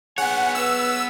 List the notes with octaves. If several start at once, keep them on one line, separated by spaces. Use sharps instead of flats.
B3 G#4 C#5 F#5 G#5
B4 F#5 E6